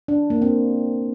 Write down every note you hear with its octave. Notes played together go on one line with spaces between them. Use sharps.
D4
A#3
C4